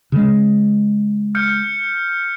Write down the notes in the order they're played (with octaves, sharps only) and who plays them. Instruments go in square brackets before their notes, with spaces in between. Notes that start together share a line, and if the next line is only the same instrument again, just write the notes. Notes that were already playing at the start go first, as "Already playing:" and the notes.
[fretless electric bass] C#3 G#3
[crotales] F6 G6 C#7